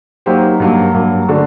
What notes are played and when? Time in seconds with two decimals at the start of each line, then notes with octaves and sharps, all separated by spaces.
0.26 F#3 A#3 D#4 G4 C5
0.60 G2 F#3 A#3
0.94 G2 F#3 A#3
1.28 D3 A3 D4 F#4